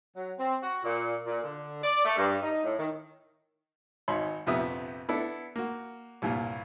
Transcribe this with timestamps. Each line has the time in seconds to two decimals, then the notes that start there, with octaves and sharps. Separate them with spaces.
0.16 F#3
0.38 C4
0.63 F#4
0.84 A#2
1.26 A#2
1.43 D3
1.84 D5
2.05 A3
2.18 G2
2.43 D#4
2.64 A2
2.79 D#3
4.08 G#1 D#4 C#5 B5 C6
4.47 A#1 F2 C3 B3 E5 D#6
5.09 B3 D4 E4 A4
5.56 A#3 F#4
6.22 C2 G2 A#2